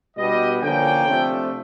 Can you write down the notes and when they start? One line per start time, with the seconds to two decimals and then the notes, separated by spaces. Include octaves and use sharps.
0.17 B2 G3 B3 D4 D#5
0.62 D3 F3 A#3 C#4 G5
1.07 C3 F3 A3 D4